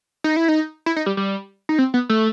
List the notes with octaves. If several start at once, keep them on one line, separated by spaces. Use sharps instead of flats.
D#4
E4
D#4
E4
D#4
G3
G3
D#4
C4
B3
A3